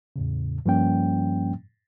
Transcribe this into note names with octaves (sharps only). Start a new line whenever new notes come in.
E2 A2 C#3
G2 F3 G3 A#3 C#4 G5